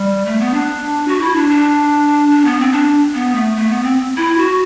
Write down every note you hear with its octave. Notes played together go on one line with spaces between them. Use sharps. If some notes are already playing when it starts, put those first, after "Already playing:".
Already playing: G3
A3
B3
D4
F#4
E4
D4
D4
D4
B3
C4
D4
B3
A3
A3
B3
C4
E4
F#4